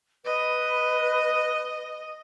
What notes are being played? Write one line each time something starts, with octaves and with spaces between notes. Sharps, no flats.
B4 D#5